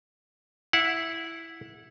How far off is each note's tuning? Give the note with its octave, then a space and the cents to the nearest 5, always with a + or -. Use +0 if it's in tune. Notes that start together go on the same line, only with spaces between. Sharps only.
E4 +0 F#5 -25